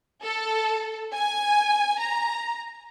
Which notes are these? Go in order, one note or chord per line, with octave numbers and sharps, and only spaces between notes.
A4
G#5
A#5